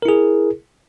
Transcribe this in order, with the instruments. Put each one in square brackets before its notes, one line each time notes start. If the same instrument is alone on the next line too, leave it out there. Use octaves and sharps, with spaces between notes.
[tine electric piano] A#4
E4
G#4